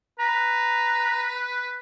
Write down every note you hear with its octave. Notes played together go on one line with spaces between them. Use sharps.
B4 A#5